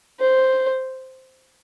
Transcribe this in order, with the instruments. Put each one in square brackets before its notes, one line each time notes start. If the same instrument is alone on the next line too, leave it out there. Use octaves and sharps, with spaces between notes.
[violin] C5